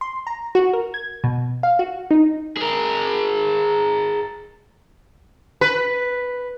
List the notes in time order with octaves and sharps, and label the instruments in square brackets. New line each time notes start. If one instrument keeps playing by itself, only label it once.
[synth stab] C6
A#5
F#4
A#4
G#6
B2
F5
F#4
D#4
[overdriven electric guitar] G#4 A#4
[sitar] B4